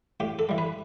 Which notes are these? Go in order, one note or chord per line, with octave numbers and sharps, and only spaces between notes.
A2 G4
A4
E3 G3
B4